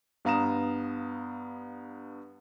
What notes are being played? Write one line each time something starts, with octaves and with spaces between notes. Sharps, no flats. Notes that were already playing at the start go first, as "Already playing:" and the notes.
G2 B3 F5 A#5 D#6 E7